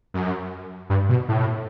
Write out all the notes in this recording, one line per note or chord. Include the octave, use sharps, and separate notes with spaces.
F#2
G2
B2
A2